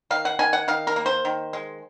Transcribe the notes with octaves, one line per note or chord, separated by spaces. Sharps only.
D#3 F5
F#5
D#3 G#5
F#5
D#3 F5
A#4
A#3
C5
D#3
G#3